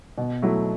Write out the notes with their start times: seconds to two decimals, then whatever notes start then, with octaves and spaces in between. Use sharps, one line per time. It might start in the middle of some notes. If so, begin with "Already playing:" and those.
0.18 B2
0.42 F#3 A3 E4